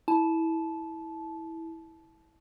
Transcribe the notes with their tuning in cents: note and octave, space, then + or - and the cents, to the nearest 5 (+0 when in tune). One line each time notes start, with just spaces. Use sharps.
E4 -15 A5 -20